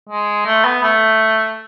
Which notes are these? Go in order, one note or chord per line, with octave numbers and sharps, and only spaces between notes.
G#3
A3
B3
A3